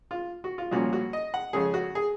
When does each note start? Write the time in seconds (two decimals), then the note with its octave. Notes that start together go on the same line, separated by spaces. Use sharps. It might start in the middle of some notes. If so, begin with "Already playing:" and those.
0.11 F4
0.44 F#4
0.58 F4
0.71 C2 A#2 F3 A#3 C#4 F#4
0.93 F#4
1.13 D#5
1.34 F#5
1.53 F2 C#3 G#3 C#4 G#4
1.74 F#4
1.95 G#4